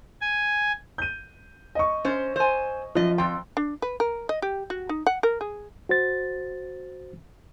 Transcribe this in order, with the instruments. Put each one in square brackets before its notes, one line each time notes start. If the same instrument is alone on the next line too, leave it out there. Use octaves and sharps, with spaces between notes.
[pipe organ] G#5
[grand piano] G6 D#7
D#5 C#6
[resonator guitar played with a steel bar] C#4 C5
C5 G#5
[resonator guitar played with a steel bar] F#2 D#5 [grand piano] F3
[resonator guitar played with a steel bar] F2 G5 [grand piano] C6
[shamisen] D4
B4
A#4
D#5
G4
F#4
D#4
F#5
A#4
G#4
[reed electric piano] F#4 C5 A6